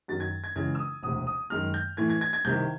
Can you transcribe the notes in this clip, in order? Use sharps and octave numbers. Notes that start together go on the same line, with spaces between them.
F#2 D#3 F#3 A6
G#6
G#6
C#2 C#3 E3 G#3 G#6
E6
D#6
E1 D2 C3 D#6
D#6
F#2 D#3 G#3 F6
G6
A2 E3 A3 G#6
G#6
G#6
G#6
C2 C3 D#3 G6